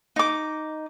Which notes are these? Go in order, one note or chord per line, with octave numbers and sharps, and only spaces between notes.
D#4 D6